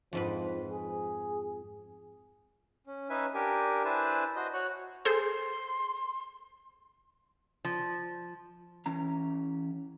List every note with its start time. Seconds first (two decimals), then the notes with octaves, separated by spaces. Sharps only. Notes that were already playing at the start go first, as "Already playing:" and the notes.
0.13 F2 G#2 F3 B4
0.72 G#4
2.87 C#4
3.10 C#4 D#4 B4 E5 G#5
3.34 D4 G4 A#4 G#5
3.85 D4 E4 B4 C5 G#5 A5
4.36 F#4 C5 D#5
4.53 F#4 C#5 F#6
5.05 G#4 A4 C5 C6
7.65 F3
8.86 E3 C#4 A#5